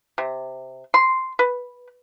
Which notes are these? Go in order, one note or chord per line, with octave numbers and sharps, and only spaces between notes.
C3
C6
B4